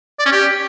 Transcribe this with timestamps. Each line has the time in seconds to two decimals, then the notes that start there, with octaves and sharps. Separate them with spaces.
0.19 D5
0.25 C#4
0.32 G4